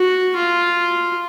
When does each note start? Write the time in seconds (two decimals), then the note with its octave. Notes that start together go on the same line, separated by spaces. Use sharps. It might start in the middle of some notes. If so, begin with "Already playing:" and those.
Already playing: F#4
0.36 F4